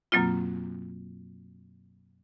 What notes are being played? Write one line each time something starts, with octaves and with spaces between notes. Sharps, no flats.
F#2 B2 F#3 A#3 C4 F4